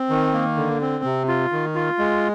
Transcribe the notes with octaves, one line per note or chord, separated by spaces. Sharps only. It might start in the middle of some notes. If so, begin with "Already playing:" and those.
Already playing: C4
D#3
A#3
D3
C4
C3
F4
D#3
F4
G#3